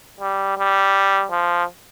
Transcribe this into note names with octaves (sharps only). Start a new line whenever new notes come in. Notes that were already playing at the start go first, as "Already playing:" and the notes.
G3
G3
F3